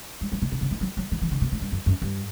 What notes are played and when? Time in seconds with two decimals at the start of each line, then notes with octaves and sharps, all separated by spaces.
0.21 G3
0.32 F#3
0.42 B2
0.52 B2
0.61 C#3
0.71 E3
0.81 F#3
0.97 F#3
1.12 E3
1.22 E3
1.31 D3
1.41 B2
1.52 A2
1.61 G2
1.72 F#2
1.86 F#2
2.02 G2